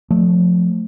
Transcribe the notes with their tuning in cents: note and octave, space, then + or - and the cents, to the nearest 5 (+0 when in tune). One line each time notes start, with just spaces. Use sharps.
F3 +30 A3 +0